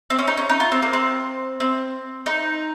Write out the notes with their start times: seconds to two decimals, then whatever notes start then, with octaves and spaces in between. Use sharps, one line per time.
0.10 C4
0.19 C#4
0.27 D#4
0.37 C#4
0.49 D#4
0.60 F4
0.72 C4
0.82 A#3
0.93 C4
1.60 C4
2.26 D#4